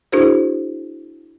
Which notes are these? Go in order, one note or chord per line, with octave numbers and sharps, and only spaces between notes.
D4 E4 F#4 G#4 A#4 C5